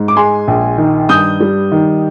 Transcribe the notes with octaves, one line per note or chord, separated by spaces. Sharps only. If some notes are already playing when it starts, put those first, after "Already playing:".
Already playing: G#2
D6
G#3 G#5 C6
A#1
D#3
G2 D#6 G6
G3
D#3